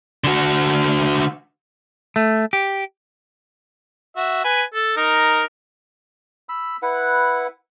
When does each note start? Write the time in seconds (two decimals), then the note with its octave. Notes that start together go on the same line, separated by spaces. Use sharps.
0.24 D3 F#4
2.16 A3
2.53 G4
4.17 F#4 E5
4.44 B4 G#5
4.74 A4
4.97 D#4 A#4
6.49 B5 E6
6.82 E4 B4 F#5